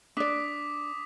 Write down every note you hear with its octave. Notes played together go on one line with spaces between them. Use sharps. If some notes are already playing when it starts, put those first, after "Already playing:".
D4 D5 D6 D#6 B6